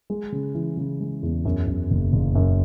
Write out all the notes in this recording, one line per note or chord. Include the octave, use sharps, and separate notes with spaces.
G#3
C#3
E3
C#3
G#3
E2
F#2
F#2
F#1
F#1
F#2